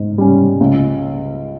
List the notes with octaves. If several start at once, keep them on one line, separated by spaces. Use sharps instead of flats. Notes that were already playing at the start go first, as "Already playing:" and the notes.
Already playing: G#2
G3 C#4
C#2